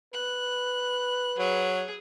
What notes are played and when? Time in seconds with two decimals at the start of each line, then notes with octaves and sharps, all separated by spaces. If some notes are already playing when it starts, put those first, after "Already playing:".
0.13 B4 F#6
1.38 F#3 G#4